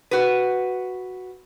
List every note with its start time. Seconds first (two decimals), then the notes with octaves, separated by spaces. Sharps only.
0.11 F#4 B4